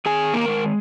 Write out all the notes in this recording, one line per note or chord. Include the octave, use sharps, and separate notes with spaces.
D#3 G#4 G#5
A#3 A#4
G#3